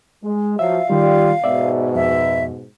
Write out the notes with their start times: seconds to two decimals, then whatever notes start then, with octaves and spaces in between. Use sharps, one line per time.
0.24 G#3
0.59 F3 F#3 E5 F5
0.90 D#3 G3 F4 G4 D5
1.44 G#2 B2 D5 E5
1.95 F2 E5